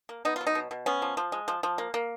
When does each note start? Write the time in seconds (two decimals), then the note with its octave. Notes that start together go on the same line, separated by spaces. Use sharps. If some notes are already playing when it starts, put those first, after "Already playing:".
0.09 A#3
0.25 B3 D#4
0.36 F#3 F4
0.47 D#4
0.55 B2
0.71 B2
0.86 B3 C#4
1.02 F3
1.17 F3
1.32 G#3
1.48 F3
1.63 F3
1.78 A#3
1.94 A#3